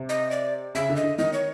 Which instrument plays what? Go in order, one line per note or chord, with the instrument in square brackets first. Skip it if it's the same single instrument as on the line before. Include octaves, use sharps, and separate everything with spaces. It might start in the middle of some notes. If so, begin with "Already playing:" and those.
Already playing: [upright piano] C3
[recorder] D#5
D5
[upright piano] C#3 [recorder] E5
[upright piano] D3
[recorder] D#5
[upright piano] D3
[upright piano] D#3 [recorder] D#5
[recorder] C#5